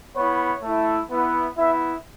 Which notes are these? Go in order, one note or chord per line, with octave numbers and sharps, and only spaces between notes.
B3 E4 C#5
A3 E4
B3 E4
B3 E4 E5